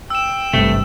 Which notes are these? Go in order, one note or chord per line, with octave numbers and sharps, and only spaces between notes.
G5 E6 E7
G#1 G2 C3 A3